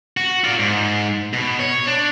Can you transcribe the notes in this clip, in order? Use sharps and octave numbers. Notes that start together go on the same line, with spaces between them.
F#4
F4 D5
G#2
B2
C#5
D4